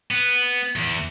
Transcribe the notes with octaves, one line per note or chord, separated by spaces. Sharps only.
B3
E2